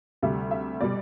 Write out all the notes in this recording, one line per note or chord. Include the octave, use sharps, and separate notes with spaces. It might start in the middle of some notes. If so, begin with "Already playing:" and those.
D2 C3 G3 E5
E5
B2 G3 D5